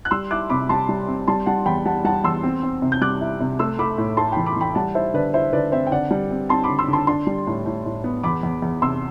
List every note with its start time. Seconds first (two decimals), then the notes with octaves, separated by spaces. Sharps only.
0.05 F#6
0.11 G3 C6 E6
0.31 E4 D6 F#6
0.49 C3 B5 D6
0.69 G3 A5 C6
0.89 G3
1.08 C4
1.28 G3 A5 C6
1.46 G3 F#5 A5
1.66 E2 G5 B5
1.85 G3 F#5 A5
2.04 G3 F#5 A5
2.24 E2 C6 E6
2.43 C4
2.63 C4
2.82 C3
2.92 G6
3.01 G3 D6 F#6
3.21 E4
3.40 C3
3.59 A3 C6 E6
3.79 A3 B5 D6
3.98 A2
4.17 A3 A5 C6
4.32 E3 G5 B5
4.46 B5 D6
4.56 E3 G5 B5
4.75 G3 F#5 A5
4.95 E4 C5 E5
5.14 D3 B4 D5
5.33 E4 C5 E5
5.53 D3 B4 D5
5.72 C4 C5 E5
5.87 G5
5.92 D3 D5 F#5
6.11 G3
6.31 C4
6.49 C4 A5 C6
6.64 B5 D6
6.69 D3
6.79 C6 E6
6.88 D3
6.93 A5 C6
7.07 D4 A5 C6
7.27 G3
7.47 A2
7.66 A2
7.86 A2
8.04 B3
8.23 E2 B5 D6
8.43 E2
8.62 E2
8.82 C3 C6 E6